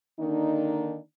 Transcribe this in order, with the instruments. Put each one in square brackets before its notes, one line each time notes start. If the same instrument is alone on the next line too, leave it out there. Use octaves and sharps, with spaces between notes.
[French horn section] D3 D#3 A#3 D4 D#4